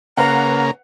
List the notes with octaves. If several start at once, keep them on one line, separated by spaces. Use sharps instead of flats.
C#3 A#3 B4 F5 F#5 A#5